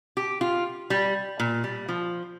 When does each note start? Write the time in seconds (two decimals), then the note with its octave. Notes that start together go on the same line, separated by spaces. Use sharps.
0.17 G4
0.41 F4
0.90 G3
1.40 A#2
1.64 G3
1.89 F3